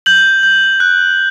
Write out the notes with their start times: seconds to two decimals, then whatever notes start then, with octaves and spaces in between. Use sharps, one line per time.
0.06 G6 F#7
0.43 G6
0.80 F#6